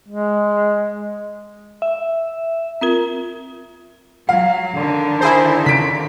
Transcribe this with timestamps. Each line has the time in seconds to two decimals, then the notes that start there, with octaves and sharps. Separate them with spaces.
0.08 G#3
1.82 E5
2.81 C4 F4 A#4
4.29 F#3 F5
4.76 D3 D#3 D4
5.21 E4 G#4 C5
5.66 C#3 B6 D7